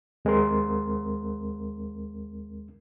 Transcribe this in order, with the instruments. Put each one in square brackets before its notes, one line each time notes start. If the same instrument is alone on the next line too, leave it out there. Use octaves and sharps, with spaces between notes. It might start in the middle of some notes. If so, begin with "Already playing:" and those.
[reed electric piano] D#2 G#3 C4 A#4 C6